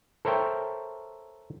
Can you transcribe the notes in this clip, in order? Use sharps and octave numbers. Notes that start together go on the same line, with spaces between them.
A4 A#4 C5 C#5 E5 G5